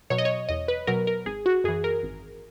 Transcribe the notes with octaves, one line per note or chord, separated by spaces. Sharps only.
B2 F#3 C#5
D#5
C#5
E2 D#5
B4
B2 F#3 A#4
A#4
G#1 G#4
F#4
F#2 E3 G#4
A#4
G#1